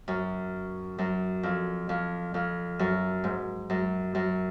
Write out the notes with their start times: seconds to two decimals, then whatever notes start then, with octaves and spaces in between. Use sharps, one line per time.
0.08 F#2
0.98 F#2
1.43 F2
1.89 F2
2.34 F2
2.79 F#2
3.24 G#2
3.70 F#2
4.15 F#2